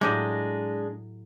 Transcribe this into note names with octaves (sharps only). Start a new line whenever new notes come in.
A2 F#3 G#3 D4 G4 D#5